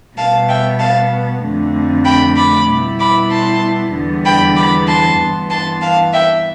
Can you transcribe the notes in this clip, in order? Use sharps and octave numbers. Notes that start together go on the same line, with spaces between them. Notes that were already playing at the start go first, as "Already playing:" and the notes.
B2 G3 B3 F5 A5
E5 G5
F5 A5
F2 D3 A3 C4
G5 B5
B5 D6
B2 G3 B3 E4
B5 D6
A5 C6
E2 D3 G3 B3
G5 B5
B5 D6
A5 C6
G2 E3 B3
A5 C6
F5 A5
E5 G5